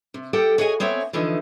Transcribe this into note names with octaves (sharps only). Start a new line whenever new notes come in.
C3
G3 G4 A4 F#5 G5
F#4 G#4 C#5 D#5 F#5 G#5
B3 C4 C#5 D5 E5 G#5
D3 E3 F3 A3 D#4